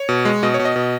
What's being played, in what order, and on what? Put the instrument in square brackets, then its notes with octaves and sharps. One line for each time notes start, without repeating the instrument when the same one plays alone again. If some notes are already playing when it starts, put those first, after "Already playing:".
Already playing: [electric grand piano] C#5
B2
G#3
B2 D#5
C#5
B2
D#5
B2